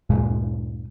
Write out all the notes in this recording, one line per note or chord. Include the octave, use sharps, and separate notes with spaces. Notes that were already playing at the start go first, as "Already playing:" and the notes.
D2 G2 A#2 G#3